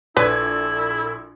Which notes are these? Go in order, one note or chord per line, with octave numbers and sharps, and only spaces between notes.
A#1 E4 A4 B4 D5 G#6